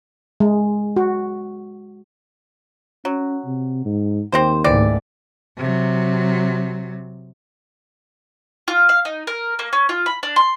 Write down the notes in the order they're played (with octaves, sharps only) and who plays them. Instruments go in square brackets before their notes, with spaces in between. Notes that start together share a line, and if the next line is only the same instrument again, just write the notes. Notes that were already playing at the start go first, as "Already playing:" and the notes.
[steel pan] G#3
F#4
[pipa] F#3 [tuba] C#4
[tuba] C3
G#2
[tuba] D#2 [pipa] C4 G4 C5
[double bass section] C#2 G#2 A3 [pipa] E3 C4 D5
[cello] C3 F#3
[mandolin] F4
F5
D#4
A#4
A#3
C#4
F4
B5
D4
C6